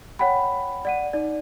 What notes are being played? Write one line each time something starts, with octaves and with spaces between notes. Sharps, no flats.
C#5 F#5 G5 B5
D5 F#5 D#7
D#4 D5